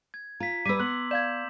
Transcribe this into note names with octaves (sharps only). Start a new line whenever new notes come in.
G#6
F4 A#5 B6
G3 B4 D6 E6 B6 D#7
B3 C6 F#6 F#7
D5 F5 G6 G#6 E7